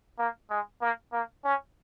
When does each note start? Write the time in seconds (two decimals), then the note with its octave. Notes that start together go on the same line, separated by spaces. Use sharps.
0.18 A#3
0.50 G#3
0.81 A#3
1.13 A#3
1.44 C#4